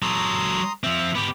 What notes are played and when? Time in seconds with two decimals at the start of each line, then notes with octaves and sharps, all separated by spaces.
0.02 F#3 A4 A#5 C6 D#6
0.84 F3 C4 E5
1.15 B3 G4 B5 D6